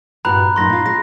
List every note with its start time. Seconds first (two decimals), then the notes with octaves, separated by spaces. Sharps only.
0.25 G2 A#2 F#4 A#5 B5 F#6
0.56 F#2 A#2 D#4 C6 A#6
0.70 A#2 F4
0.86 G#3 A#6